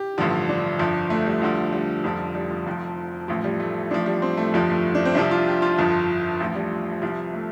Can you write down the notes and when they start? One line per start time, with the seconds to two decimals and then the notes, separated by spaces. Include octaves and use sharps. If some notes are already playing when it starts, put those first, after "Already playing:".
Already playing: G4
0.18 A1 G2 D3 F3
0.49 D4
0.79 G1 F2 F3
1.10 A3
1.26 G3
1.42 D2 D3 F3
1.73 G3
2.04 F1 F2 D3 F3
2.35 G3
2.51 F3
2.66 F1 F2 F3
3.28 A1 A2 F3
3.44 G3
3.60 A3
3.91 A1 A2 F3 D4
4.06 G3
4.22 C4
4.37 A3
4.53 G1 F2 F3 G3
4.69 A3
4.95 D4
5.05 C4
5.15 C2 C3 F3 D4
5.31 F4
5.47 G4
5.62 F4
5.78 G1 F2 F3
6.40 A1 A2 F3
6.56 G3
7.02 C2 C3 F3
7.33 A3